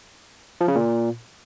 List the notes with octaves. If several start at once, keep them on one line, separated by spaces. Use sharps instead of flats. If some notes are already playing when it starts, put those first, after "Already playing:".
F3
C#3
A#2